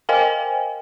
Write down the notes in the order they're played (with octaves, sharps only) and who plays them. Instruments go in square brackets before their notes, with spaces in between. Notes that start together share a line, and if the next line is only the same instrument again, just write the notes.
[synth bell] A#4 C5 D#5 F5 G5 G#5